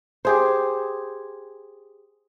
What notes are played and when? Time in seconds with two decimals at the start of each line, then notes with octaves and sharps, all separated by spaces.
0.25 G4 G#4 C5